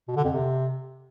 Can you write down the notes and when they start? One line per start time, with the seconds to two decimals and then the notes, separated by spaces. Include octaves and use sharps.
0.08 B2
0.16 D3
0.24 F2
0.33 C3